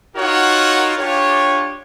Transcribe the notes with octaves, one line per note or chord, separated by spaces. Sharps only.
D#4 F4 F#4 A#4 C#5 F#5
D4 F4 G4 C#5